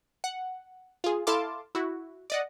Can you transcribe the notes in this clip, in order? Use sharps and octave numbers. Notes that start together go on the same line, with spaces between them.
F#5
F4 G#4
E4 A4 F5 A5 C6 D6
E4 F#4
D5 D#5 F#5